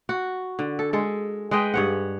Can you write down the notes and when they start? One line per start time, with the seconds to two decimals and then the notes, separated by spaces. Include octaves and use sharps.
0.09 F#4
0.59 D3
0.79 A4
0.93 G#3 A4
1.51 G#3 B4 D#5 G5
1.74 G2 C#5 F#5